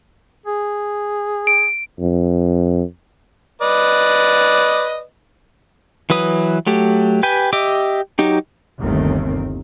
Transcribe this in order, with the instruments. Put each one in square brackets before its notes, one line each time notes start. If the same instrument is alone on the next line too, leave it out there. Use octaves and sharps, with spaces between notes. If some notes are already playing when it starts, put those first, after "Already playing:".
[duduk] G#4
[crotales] D7
[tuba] F2
[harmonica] B4 D5 D#5
[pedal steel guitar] E3 F#3 B4 D#6
F#3 A3 G4
G4 B4 G5 G#5
G4 D#5 E5 D6
F#3 D#4 G4
[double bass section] G1 D#2 C3 D#3 A3 C4